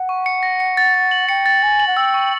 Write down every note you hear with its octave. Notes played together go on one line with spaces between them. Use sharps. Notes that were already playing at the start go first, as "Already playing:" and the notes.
Already playing: F#5
C#6
C#7
A#6
C#7
A6
A6
F#7
G5 C#7
A6
G#5 A6
F#7
F#5
G5 E6
C#6